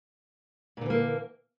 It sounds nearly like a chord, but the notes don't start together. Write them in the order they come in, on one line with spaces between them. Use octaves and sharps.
A#2 D3 E3 A#3